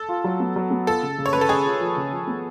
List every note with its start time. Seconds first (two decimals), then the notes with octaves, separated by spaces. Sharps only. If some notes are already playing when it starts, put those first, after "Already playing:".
Already playing: A4
0.09 F4
0.24 F#3
0.40 B3
0.56 F#3
0.71 B3
0.87 F4 A4
1.02 C#3
1.18 C#3
1.26 C#5
1.33 C#3 B4
1.41 A4
1.49 C#3 G#4
1.65 F4
1.81 F3
1.96 C#3
2.12 F3
2.27 B3